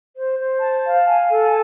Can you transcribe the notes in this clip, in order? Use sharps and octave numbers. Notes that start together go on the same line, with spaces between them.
C5
C5
A5
F5
G#5
A4